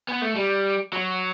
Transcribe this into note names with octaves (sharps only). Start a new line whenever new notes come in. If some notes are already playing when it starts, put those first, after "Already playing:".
B3
A3
G3
F#3